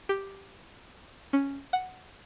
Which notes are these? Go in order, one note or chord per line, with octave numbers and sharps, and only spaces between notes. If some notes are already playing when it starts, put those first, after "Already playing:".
G4
C#4
F#5